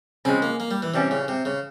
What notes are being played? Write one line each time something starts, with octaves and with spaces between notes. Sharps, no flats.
C#3 F3 G#3 C4
A#3
A#3
G3
E3
C3 E3 G3 C#4
C#3
C3
C#3